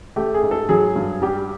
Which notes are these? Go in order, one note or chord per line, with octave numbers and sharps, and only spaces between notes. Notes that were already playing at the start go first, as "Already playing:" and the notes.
A3 G4
G#4
G#2
A4
F#3 G#4
G2
G3 G4